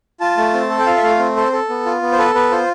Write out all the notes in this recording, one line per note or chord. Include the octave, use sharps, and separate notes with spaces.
F4 A5
A3
C4
A4
G5
F4 F5
E5
A3 F5
C4
A4 C5
A4
B3
F4
B3
C5
A4 B4
B3 B4
F4 C5